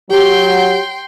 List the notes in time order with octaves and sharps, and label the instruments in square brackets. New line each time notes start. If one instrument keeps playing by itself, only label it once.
[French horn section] F#3 [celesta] G4 [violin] G5 C6